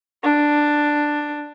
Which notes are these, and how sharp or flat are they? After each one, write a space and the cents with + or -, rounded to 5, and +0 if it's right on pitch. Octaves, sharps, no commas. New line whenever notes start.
D4 +5